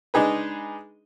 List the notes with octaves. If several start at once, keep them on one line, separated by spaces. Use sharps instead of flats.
G#3 D4 D#4 G#4 B4